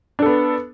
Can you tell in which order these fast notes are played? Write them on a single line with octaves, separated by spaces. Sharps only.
D4 A4 B3